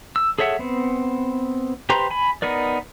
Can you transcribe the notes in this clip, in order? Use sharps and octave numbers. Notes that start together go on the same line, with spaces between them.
E6
G#4 A4 C#5 E5 F#5
B3 C4
G4 B4 C5 A#5 C6
G#5 B5
B3 D#4 A#4 D5